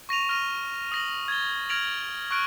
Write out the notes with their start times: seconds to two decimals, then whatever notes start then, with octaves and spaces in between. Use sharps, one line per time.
0.09 C#6 A#6 D#7 F7
0.29 F6 A#6 D#7
0.92 D#6 A#6 F#7
1.28 G#6 A6 G7
1.69 F6 G#6 A#6 D7 F7 F#7
2.31 C#6 F6 F#6 D7